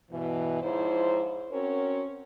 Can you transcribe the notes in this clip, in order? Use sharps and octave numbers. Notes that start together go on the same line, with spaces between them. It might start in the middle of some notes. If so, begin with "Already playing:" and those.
G2 B2 E3
G#2 F3 D#4 E4 C5 C#5
C4 C#4 F#4 A#4 C#5